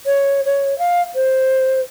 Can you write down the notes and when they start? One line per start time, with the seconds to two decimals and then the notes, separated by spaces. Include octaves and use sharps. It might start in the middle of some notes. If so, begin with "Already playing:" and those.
0.06 C#5
0.45 C#5
0.79 F5
1.15 C5